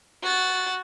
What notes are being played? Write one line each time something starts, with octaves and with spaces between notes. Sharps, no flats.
F#4 A6